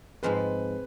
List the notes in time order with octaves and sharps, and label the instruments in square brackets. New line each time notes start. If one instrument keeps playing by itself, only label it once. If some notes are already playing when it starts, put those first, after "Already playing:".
[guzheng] G#2 F3 G#3 C4 [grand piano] B4